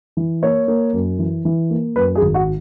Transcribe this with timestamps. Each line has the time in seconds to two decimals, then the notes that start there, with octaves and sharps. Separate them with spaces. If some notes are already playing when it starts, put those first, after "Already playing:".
0.17 E3
0.42 A#3 C#5
0.68 A#3
0.93 F#2
1.19 E3
1.45 E3
1.70 A#3
1.96 F#2 B4
2.15 G#4
2.22 G#1
2.34 F#4